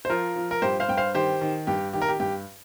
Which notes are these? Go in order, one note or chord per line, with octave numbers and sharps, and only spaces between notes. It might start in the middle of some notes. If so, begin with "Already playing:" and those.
C5
F3 F4 A#4
F3
A#4
G2 G4 C5
C5 F5
G2 G5
C5 F5
D#3 G4 C5
D#3
G2 G4
D#3 G4
A#4
G4
G2 G4